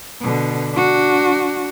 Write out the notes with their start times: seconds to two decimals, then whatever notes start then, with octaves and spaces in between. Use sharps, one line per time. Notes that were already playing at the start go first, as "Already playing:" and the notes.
0.21 B2 D3
0.73 D4 F#4